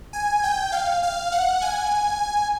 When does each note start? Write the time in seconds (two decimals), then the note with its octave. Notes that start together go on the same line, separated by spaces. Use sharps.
0.13 G#5
0.44 G5
0.72 F5
1.03 F5
1.32 F#5
1.61 G#5